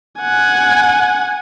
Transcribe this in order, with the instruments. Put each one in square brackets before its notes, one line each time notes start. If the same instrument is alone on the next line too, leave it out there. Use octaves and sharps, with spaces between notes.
[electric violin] F#5 G#5